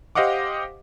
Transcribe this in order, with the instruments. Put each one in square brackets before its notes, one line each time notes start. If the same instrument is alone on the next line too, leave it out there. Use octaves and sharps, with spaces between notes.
[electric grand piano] G4 C5 D#5 F5 F#5 D6